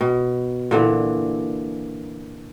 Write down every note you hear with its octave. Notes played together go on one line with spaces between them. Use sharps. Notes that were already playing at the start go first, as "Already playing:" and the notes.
B2
A#2 D3 E3